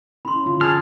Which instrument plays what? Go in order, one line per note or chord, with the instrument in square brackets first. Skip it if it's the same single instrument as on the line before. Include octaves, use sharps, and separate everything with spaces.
[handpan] C#4 E4 [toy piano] B5 C6
[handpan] D3 F4
[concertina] G#4 A5 [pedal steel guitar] F6